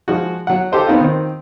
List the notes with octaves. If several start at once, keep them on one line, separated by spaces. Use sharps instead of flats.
F3 G#3 F#4
F#3 F#5
G4 A4 C5 D#5
B3 C4 D#4 F4
D#3 C4